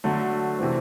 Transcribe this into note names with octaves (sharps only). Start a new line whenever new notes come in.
D3 F#3 A3
C3 E3 A3 C4